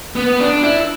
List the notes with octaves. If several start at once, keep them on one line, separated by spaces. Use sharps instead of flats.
B3
D4
E4